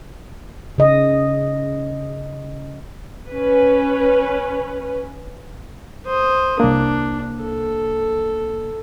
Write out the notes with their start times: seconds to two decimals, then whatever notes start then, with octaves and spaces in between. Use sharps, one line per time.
0.78 C#3 D#5
3.29 C#4 B4
6.06 C5 D#6
6.60 C2 A#3 D4
7.42 A4